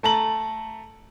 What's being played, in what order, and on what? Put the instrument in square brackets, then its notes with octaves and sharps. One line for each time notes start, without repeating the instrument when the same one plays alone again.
[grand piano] A3 A5 A#5 F#7